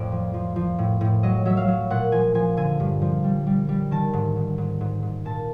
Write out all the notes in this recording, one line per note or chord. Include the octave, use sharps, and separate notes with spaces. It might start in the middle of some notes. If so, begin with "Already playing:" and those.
Already playing: F2 A2 D5
F3
F3
F3
A2
A2
F#3 D#5
F#3 E5
F5
F#3
A#2 F#5
F3 G#5
F3 G#5
D3 G#5
G2
F3
G3
G3
G3
D#3 A5
G#2
G#2
G#2
G#2
G#2
A#2 A5